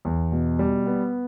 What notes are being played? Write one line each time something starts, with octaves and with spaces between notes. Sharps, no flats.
E2
B2
G3
B3